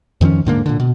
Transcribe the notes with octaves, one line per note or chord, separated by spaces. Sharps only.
F2 D#3 F3 C#4
D#1 G#2 D3 A#3
A#2 D3
B2